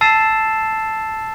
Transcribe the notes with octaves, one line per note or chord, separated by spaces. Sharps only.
A5 E6 A6 C7 E7